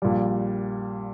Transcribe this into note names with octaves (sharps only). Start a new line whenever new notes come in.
A#1 A#2 G3